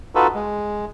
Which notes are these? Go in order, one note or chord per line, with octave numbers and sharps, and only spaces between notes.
D#4 F4 F#4 A4 B4
G#3